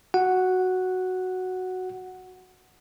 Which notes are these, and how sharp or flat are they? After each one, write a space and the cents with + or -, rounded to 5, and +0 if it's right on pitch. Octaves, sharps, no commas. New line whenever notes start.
F#4 +0 F#5 +0